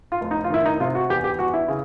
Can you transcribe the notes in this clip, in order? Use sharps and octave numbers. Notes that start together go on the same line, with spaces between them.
F4
F1
D#4
F4
D#3 E4
D#4
C3 F4
F#4
E2 G4
G4
E2 F#4
E4
C#3